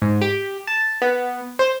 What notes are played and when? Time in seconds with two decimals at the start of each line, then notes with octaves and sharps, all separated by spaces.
0.02 G#2
0.22 G4
0.67 A5
1.02 B3
1.59 C5